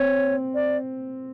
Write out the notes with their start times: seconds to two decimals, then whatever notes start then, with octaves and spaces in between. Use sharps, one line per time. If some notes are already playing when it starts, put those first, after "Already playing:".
Already playing: C4 C#5
0.54 D5